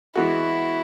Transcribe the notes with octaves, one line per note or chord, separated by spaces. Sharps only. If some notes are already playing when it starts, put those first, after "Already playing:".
E3 G#3 B3 E4 F#4